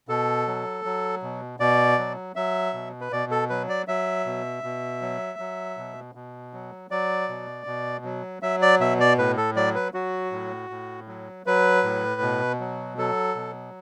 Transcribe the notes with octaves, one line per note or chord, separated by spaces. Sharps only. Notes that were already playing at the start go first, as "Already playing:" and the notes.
B2 A4
F#3
F#3
B2
B2 D5
F#3
F#3 E5
B2
B4
B2 D5
A4
F#3 B4
D5
F#3 E5
B2
B2
F#3
F#3
B2
B2
F#3
F#3 D5
B2
B2
F#3
F#3 E5
D5
B2 E5
D5
A2 B4
A4
F#3 D5
B4
F#3 F#4
A2
A2
F#3
F#3 B4
A2
B2
F#3
F#3 A4
B2